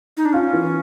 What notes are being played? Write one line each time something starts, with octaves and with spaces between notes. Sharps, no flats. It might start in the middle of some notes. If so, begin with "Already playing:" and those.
D#4
D4
C#4 F4
E3